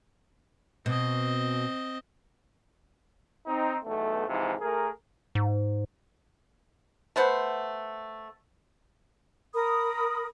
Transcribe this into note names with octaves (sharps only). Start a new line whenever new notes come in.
B2 C4 D#5
C4 D#4
B1 E2 A3
G#2 C3 E3 F3
A3 G#4 A#4
G#2
A3 B3 C5 F#5
A#4 B5 D#6